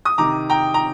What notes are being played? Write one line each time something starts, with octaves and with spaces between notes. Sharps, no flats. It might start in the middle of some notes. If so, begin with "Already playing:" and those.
D#6
C3 D#3 A#5 D6
G5 A#5
A#5